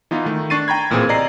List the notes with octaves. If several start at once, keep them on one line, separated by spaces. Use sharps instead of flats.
E3 B3 D#4 F4
D#3 A3
D4 C#6 A6 C7 D#7
G5 A#5 B5 G#6
A1 A#2 E3 C4 G#4
C3 D5 D#5 A#5 C7